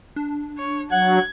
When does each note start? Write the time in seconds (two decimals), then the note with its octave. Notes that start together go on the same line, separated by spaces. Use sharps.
0.16 D4
0.58 C#5
0.92 F#3 F#5 G#6